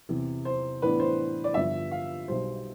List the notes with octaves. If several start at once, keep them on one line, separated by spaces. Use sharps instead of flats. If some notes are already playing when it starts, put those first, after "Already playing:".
E2 C3 E3
C5
A2 E3 B3 D4 B4
C5
D5
G1 G2 F3 E5
F5
B1 B2 G3 C5